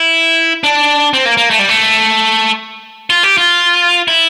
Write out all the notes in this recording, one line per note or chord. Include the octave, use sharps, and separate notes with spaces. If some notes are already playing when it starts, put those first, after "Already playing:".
Already playing: E4
D4
C4
A#3
A#3
A3
G3
A3
F4
G4
F4
E4